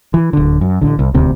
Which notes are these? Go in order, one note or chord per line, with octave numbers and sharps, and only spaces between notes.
E3
D1 D3
F#2
A1 D3
C2
D#1 D2 C3